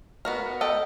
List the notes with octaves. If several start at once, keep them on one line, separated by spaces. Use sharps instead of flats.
B3 F#4 A#4
A4 D#5 G5